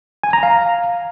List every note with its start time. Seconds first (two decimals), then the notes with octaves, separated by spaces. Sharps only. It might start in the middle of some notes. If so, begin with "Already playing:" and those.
0.23 G#5
0.33 A#5
0.43 F5